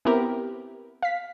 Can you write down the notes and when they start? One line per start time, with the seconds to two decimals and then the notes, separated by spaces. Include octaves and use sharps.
0.05 B3 C4 E4 G4 A#4
1.03 F5 B6